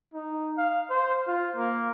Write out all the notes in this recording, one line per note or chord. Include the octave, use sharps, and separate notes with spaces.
D#4
F5
C5
F4
A#3